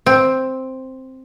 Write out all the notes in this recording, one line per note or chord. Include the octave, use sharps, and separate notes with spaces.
C4